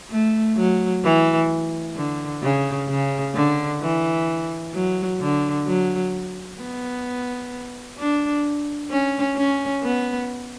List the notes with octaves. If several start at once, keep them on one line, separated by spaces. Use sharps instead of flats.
A3
F#3
E3
D3
C#3
C#3
D3
E3
F#3
D3
F#3
B3
D4
C#4
C#4
B3